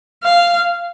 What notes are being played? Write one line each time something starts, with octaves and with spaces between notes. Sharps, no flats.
F5